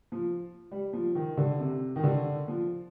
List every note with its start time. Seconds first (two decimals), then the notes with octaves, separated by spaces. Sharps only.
0.12 F3
0.71 G3
0.93 F3
1.15 D#3
1.37 D3
1.60 C3
1.96 D#3
2.04 D3
2.48 F3